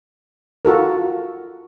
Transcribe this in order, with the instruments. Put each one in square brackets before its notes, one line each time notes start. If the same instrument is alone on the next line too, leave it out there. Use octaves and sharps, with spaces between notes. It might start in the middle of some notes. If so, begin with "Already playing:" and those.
[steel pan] F4 F#4 A4 A#4